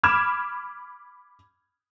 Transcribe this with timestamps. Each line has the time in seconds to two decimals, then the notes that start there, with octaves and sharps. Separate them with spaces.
0.03 B5 D6 F6 G#6 E7